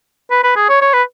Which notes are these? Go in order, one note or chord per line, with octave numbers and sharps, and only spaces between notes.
B4
B4
G#4
C#5
C#5
B4